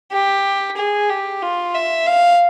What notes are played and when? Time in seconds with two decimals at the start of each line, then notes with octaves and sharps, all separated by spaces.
0.12 G4
0.77 G#4
1.10 G4
1.42 F4
1.75 E5
2.07 F5